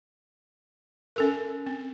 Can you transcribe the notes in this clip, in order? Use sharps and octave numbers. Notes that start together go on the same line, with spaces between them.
C#4 A4 A#4
C4